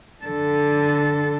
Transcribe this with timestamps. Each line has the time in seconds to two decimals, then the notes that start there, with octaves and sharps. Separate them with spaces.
0.24 D3 A4